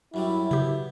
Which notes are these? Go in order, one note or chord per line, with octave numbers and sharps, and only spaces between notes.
F#2 F#3 G3 E4
C#3 B3 G4